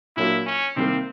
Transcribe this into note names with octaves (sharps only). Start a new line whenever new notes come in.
A#2 F#3 A#3 D4 E4 F4
C#4
C3 D#3 G3 A#3 C4